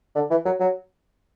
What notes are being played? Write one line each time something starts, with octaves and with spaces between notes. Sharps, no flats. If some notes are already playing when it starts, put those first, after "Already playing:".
D3
E3
F#3
F#3